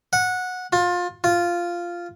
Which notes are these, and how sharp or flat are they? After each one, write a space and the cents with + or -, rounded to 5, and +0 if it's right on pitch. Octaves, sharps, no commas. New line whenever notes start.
F#5 -15
F4 +25
F4 -5